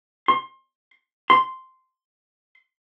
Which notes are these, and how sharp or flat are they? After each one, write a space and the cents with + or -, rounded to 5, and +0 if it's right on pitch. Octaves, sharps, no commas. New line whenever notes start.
C6 +25
C6 -5